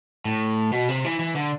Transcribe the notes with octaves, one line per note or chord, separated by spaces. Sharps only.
A2
B2
C3
E3
E3
D3